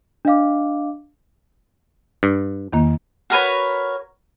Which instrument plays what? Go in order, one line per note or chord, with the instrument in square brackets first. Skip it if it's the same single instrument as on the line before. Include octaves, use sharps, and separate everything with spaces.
[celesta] D4 D#5 F5 D6
[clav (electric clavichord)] G2
[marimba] E2 D#3 A#3
[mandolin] F#4 A#4 B4 C#5